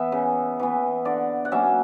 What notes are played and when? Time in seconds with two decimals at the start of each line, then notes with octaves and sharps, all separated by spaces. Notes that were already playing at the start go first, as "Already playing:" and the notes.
Already playing: E3 B3 E5
0.12 C#3
0.59 E3 B3
1.05 D3 D5
1.45 F#5
1.52 F#3 A#3 C#4 E5